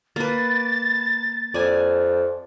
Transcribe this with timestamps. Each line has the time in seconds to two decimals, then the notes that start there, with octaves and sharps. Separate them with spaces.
0.16 A#3 B4 A6
1.54 F2 D5 G#5